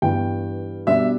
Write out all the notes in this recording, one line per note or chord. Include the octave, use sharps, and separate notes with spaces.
G2 E3 B3 G5
B2 G3 D4 E5